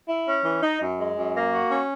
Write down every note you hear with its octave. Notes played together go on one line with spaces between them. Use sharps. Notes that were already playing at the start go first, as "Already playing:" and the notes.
E4
C#4
E3
D#4
F#2
G#3
F#2
A#3
F#4
C#4